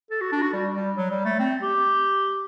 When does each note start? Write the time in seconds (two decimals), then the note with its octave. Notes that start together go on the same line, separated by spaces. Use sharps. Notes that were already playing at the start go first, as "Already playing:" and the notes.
0.11 A4
0.21 F#4
0.32 D4
0.42 F#4
0.53 G3
0.75 G3
0.97 F#3
1.11 G3
1.25 A3
1.39 C4
1.62 G4